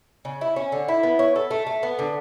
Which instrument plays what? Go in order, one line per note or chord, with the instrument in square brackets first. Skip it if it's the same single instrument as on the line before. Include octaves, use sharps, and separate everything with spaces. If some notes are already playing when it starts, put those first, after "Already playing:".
[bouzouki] C#3
E4
C#4
D3
E4
B3
C#5
A4
A3
A3
B3
D3